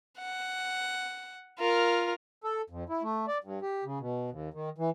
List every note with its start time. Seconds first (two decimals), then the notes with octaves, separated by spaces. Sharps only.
0.19 F#5
1.59 F4 A#4
2.44 A4
2.70 F2
2.89 E4
3.02 A3
3.28 D5
3.44 G2
3.62 G4
3.84 C#3
4.00 B2
4.30 D#2
4.54 D#3
4.78 E3